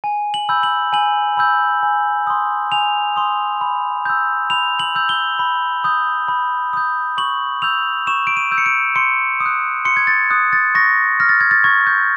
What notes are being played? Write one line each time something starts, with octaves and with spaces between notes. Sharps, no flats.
G#5
F#7
B5 E6 G6
F#7
G#5 F#7
B5 E6 G6
G#5
C6 D#6
G#5 F7
C6 D#6
B5
E6 G6
B5 F7
F#7
E6 G6
G7
B5
D#6 G6
B5
D#6 G6
C#6 F#7
E6 G6 F7
C#6 E7
D7
D#7
E6 G6
C#7
D7
C6 C#7
D#6
F#6
C6 C#7
G#6
A6
D#6 F#6
A6
C#6 A#6
F6 A#6
A6
G#6
A6
C#6 G#6
G6